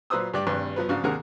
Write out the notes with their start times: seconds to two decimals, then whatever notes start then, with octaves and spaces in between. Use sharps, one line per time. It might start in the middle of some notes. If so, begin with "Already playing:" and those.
0.10 A#2 F#3 B4 C5 D#6 E6
0.34 G2 G3 G4 D5
0.47 G#1 G2 C3 B4
0.76 F3 F#3 B3 B4
0.89 G#2 C#3 D4 F#4 F5
1.03 D#2 C3 D4 G#4 A#4 F#5